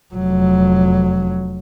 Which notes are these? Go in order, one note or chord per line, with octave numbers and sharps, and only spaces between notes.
F1 F#3